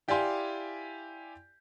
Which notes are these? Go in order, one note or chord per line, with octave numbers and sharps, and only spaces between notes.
E4 G4 D5 F5 G#5 C6